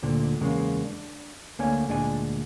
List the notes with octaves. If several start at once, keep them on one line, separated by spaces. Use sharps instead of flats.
D2 A#2 D3
E2 C#3 G#3 A#3
D4
D2 D3 A#3 D4 C#5 G#5
D2 A#2 G#3 D4 F4 G#5